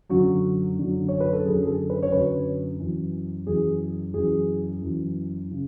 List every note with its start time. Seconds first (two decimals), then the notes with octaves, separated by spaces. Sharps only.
0.09 F#2 D3 F#3 F#4
0.77 F#2 D3 F#3
1.08 C#5
1.20 B4
1.33 A4
1.44 F#2 D3 F#3 G#4
1.63 G#4
1.67 A4
1.90 B4
2.03 C#5
2.12 F#2 D3 F#3 B4
2.80 F#2 E3
3.47 F#2 E3 G#4
4.14 F#2 E3 G#4
4.82 F#2 E3
5.51 C#3